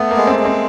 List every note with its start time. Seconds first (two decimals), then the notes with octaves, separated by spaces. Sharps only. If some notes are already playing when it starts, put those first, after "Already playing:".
Already playing: A3 B3
0.11 A#3
0.17 G#3
0.27 C4
0.39 G#3
0.45 C4